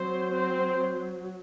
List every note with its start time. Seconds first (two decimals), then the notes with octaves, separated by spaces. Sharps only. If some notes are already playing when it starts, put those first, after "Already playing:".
Already playing: F#3 C4 C5
0.33 C4 C5